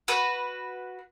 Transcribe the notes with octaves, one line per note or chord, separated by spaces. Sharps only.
F#4 B4